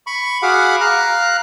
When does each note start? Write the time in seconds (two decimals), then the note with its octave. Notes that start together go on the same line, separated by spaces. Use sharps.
0.07 B5 C#6
0.42 F#4 G#4 F5 F#5 B5 D6
0.81 F5 A#5 F#6